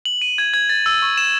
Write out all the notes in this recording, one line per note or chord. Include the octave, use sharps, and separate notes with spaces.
F#7
D#7
G#6
G#6
A6
E6
C#6
E7